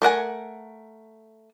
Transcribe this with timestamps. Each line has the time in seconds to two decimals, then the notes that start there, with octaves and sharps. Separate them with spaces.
0.02 A3 A#4 F#5 G#5